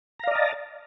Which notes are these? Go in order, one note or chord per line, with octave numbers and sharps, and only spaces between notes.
D5 D#5 F5 A5 A#5